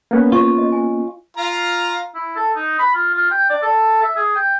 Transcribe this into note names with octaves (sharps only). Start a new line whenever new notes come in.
A#3 B3 C#4
F4 C#5 C#6
D#5
G#5
F4 F5 A#5
E4
A4
D#4
B5
F4
F4
G5
D5
A4
E5
G#4
G5